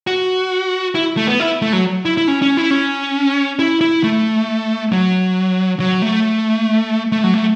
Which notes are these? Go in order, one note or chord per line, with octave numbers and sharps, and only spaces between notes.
F#4
E4
A3
B3
E4
A3
F#3
E4
E4
C#4
C#4
E4
C#4
E4
E4
A3
F#3
F#3
A3
A3
F#3
A3